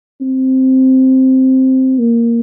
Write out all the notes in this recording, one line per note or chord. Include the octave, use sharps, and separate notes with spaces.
C4
A#3